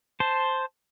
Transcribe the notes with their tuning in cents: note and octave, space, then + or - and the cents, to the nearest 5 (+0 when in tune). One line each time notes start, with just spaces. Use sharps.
C5 +0 A5 +0